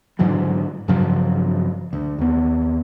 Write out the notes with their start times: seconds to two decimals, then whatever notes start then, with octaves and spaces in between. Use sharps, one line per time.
0.19 G#2 D3 E3 F#3
0.88 G2 C#3 F3 F#3
1.93 D2
2.19 D#2 B3